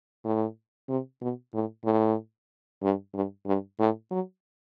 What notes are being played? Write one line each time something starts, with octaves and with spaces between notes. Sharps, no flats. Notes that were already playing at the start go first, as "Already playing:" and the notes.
A2
C3
B2
A2
A2
G2
G2
G2
A2
F#3